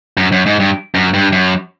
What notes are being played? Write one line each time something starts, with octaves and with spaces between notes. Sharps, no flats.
F#2
F#2
G#2
G2
F#2
G2
F#2